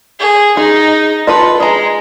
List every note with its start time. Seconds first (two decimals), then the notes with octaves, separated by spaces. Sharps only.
0.20 G#4
0.57 D#4 G#4
1.27 F4 A4 B4 D#5
1.60 G#3 D#5 A#5